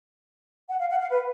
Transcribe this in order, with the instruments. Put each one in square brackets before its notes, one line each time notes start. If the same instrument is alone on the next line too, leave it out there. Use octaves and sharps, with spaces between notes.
[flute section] F#5
F5
F#5
F5
B4